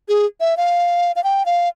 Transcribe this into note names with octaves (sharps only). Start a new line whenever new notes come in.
G#4
E5
F5
F5
G5
F5